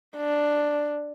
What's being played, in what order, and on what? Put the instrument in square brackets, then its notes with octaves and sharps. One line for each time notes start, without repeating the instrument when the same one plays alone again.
[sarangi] D4